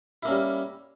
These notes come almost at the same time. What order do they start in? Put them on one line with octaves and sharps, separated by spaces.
E4 A#3 C#4 G3